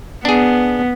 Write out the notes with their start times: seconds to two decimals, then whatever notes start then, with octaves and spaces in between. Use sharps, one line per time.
0.25 B3 D4 G#4